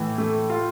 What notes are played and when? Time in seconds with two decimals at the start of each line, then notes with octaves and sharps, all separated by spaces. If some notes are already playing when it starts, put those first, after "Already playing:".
Already playing: A2 E3
0.18 A3
0.50 F4